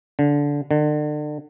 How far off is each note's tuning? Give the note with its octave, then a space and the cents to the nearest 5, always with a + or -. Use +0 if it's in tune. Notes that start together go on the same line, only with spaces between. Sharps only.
D3 -20
D3 +35